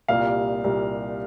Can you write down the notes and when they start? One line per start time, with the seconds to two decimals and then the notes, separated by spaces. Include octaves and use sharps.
0.08 C2 A#2 G3 F5
0.64 C2 A#2 G3